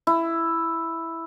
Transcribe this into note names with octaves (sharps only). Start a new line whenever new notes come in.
E4